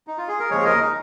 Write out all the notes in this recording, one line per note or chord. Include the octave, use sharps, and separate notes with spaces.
D#4
F4
G#4
A#4
D#2 C#3 F3 G#3 G#4 C#5
A#4 D#5
D#4